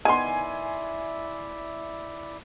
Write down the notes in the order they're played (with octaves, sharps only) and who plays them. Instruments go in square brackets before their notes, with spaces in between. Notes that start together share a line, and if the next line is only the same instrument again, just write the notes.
[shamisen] D#3 B3 [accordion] E4 D5 E5 [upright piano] G#5 C6